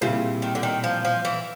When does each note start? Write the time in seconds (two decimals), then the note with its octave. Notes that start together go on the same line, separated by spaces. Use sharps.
0.01 A#2 C#3 G3 C4 E4
0.42 D#3
0.55 D3
0.63 D#3
0.84 F3
1.05 F3
1.25 E3